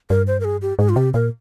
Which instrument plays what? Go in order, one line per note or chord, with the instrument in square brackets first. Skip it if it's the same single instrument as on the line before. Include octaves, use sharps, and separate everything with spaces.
[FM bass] G2 [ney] A#4
[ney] C5
A#4
G#4
G4
[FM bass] G#2 [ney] G#4
[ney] F4
[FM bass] C3 [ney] G4
[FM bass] A#2 [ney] A#4